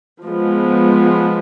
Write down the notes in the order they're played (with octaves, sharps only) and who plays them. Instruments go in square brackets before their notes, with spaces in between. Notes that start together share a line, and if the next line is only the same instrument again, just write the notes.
[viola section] F3 G#3 B3